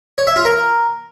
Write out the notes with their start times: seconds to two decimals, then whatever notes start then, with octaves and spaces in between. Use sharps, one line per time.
0.18 C#5
0.27 E5
0.36 F4
0.45 A#4